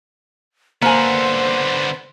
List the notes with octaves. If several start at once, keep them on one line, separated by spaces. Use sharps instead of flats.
D3 A#3 B3 C5 G#5